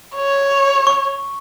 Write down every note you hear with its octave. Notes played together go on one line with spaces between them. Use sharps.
C#5
C#6